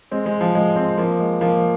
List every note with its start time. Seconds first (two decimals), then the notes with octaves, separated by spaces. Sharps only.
0.11 G#3 C4
0.26 G#3
0.41 F3
0.55 G#3
0.76 G#3 C4
0.98 F3 A#3
1.19 G#3
1.41 F3 A#3